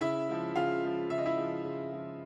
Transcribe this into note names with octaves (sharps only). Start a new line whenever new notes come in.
C#3 E4 E5
F3 G#3
C#3 F4 F5
F3 G#3
C#3 E5
D#5
E4 E5
F3 G#3
C#3
F3 G#3